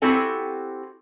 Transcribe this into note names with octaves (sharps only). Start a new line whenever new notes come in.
C4 E4 F#4 G4 A4 G#5